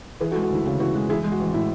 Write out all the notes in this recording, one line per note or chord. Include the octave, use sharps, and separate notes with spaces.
E3 G#4 B4
F#4 A4
G#3
F#4
D2 E4
C#3 F#4
E3 F#4
G#3 F#4
E3 E4 G#4
G#3
F#4
A1
A2 E4